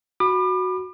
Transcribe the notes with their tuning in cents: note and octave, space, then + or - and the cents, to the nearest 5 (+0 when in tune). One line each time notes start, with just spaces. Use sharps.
F#4 +0 B5 +0 D6 +40